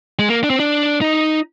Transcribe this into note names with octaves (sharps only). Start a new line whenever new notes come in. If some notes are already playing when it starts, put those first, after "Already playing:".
G#3
A#3
D4
C4
D4
D#4